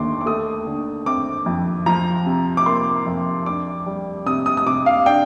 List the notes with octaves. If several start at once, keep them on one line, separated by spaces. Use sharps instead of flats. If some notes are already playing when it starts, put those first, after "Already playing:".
Already playing: D#2 D3 C6 D6
D6
A3 D#6
D3
C4 D6
F2
F3 A#5
C3
D6
A#3 C6
F2
D4 D6
G3
C3 D#6
D#6
D#6
C3 D6
F5
D4 G5